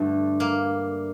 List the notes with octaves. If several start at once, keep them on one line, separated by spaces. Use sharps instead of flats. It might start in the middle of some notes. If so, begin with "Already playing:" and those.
Already playing: G2 D3 A3
A#3